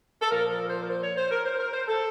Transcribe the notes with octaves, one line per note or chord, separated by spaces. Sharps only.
A4
A#2 F3 A#4
A#4
C5
A#4
C5
C#5
C5
A#4
C5
A#4
C5
A4